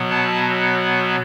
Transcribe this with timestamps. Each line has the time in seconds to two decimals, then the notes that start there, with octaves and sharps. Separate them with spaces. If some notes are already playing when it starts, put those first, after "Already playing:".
Already playing: B2 F#3 B3
0.10 A5